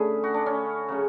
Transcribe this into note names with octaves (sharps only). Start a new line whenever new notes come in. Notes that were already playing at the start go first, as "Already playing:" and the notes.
Already playing: D3 A3 C#4 G#4 B4
F#4
D4
C#4
C#3 F#3 C#4